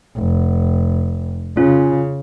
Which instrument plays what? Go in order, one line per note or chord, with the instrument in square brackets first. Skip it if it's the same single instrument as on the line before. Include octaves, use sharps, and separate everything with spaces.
[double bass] F1
[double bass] C#3 [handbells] C#4 F4